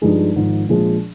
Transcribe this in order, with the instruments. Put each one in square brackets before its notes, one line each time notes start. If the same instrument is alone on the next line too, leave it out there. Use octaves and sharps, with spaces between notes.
[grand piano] G2 F3 G#3 D#4
G#1 G#2 F3
A#1 A#2 F3 G#3